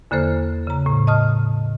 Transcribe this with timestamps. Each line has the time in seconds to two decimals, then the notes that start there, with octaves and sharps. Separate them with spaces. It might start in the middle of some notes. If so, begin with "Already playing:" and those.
0.11 E2 D3 A#3 A4 C5 F6
0.67 C#3 A#5
0.86 A2
1.07 D#5 A5 D#6 F6